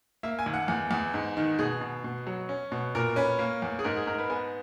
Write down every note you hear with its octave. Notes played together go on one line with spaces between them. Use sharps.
A#3 E5
G#5
D#2
F#5
E2
E2
G#2
D#3
B2 G#4
B2
B2
F#3
C#4
B2
A#2 A#4
C#4 B4
A#3
E2
G#4
G#2 A#4
G#4
G#2 A#4
B4
B3 G#5